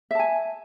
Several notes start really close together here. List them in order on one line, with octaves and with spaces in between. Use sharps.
E5 A5 G#5